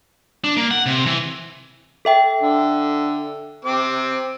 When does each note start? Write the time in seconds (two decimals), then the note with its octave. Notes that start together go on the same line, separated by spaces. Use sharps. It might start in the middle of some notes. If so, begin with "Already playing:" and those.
0.44 D4
0.57 A#3
0.71 F#5
0.86 C3
1.06 E3
2.05 A4 E5 G5
2.41 D3
3.65 C4 D6